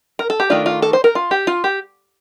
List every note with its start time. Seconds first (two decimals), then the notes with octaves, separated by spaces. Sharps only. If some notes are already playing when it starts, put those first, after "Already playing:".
0.19 A#4
0.30 A4
0.40 G4
0.50 D#3 A3 D4 F4
0.66 F4
0.82 A4
0.93 C5
1.04 A#4
1.15 F4
1.31 G4
1.47 F4
1.64 G4